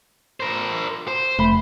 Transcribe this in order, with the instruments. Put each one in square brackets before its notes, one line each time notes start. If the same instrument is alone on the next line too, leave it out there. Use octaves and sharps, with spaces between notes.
[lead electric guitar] A#4 C5
C5
[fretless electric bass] F1 [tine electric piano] A3 B5